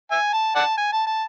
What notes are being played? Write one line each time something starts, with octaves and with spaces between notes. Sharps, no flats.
E5 G#5
A5
D5 F#5 A5
G#5
A5
A5